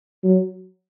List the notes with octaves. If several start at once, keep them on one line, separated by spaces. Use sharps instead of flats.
F#3